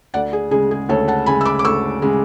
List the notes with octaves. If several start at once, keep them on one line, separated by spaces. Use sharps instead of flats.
D2 D5 F#5
G#4
C#3 G#3 G#4
G#4
D2 A4 C#5
F#5 A5
C#3 G#3 G#5 B5
E6
B5 D6
D6
D2 C#6 E6
C#3 G#3